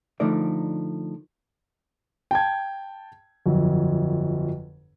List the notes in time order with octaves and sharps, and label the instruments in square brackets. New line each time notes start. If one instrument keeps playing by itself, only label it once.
[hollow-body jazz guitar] D3 F3 A3 D#4 A#4 D5
[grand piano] G5 A5 G#6
G1 F2 F#3